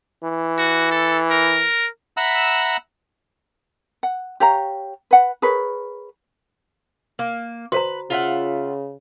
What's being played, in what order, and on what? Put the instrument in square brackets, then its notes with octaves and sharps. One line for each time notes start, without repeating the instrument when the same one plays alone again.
[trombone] E3
[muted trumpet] F#4
A4
A#4
[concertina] E5 F#5 A#5 B5 E6
[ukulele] F#5
G4 C#5 F5 A#5
B4 F#5
G#4 A#4 B4 C#5
[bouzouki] A#3
[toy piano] F#4 C5 A#5 [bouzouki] B4
[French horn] C#3 [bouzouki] F4 E5 F#5